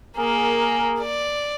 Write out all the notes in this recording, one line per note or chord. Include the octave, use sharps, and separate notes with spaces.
A#3 G#4 A#4
D5